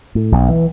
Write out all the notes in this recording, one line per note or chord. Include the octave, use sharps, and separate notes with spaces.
A2
B1
E3